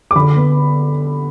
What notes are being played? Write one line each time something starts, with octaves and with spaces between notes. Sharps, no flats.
D6
D3 B5
B3